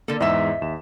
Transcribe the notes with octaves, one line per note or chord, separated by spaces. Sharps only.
D3 A#3 A4
E2 G#2 D#5 E5 E6
D#2 E7